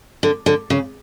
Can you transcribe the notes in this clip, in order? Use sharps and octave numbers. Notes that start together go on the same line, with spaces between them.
D3
D3
C#3